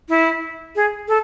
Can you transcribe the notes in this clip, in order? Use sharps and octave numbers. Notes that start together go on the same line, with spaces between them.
E4
G#4
A4